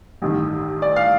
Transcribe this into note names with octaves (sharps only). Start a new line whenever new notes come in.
A1 G2 D#3
D5
F5